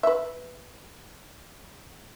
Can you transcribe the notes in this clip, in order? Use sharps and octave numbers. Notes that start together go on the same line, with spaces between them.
B4 E5